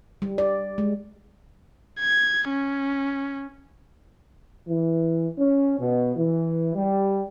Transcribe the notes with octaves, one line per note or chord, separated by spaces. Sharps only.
G3
D5
G#3
G#6
C#4
E3
C#4
B2
E3
G3